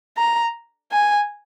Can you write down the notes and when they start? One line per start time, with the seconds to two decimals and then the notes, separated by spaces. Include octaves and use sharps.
0.17 A#5
0.92 G#5